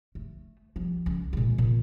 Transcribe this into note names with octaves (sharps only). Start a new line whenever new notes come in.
A3
F3 G3
C#2
A#2 G#3
A#2 D3